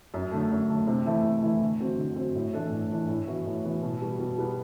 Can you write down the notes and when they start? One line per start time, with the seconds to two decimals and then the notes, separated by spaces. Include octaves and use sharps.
0.14 F#2
0.32 D3 A3
0.51 F#2
0.69 D3 A3
0.87 C3
1.05 E3 A3 E4
1.24 C3
1.42 E3 A3 E4
1.61 D3
1.80 F#3 C4 F#4
1.99 D3
2.16 F#3 C4 F#4
2.35 A2
2.53 E3 A3 D4 A4
2.72 A2
2.91 E3 A3 D4 A4
3.09 A2
3.27 E3 B3 F#4
3.46 A2
3.65 E3 B3 F#4
3.82 B2
4.01 G3 B3 F#4
4.19 B2
4.38 G3 B3 F#4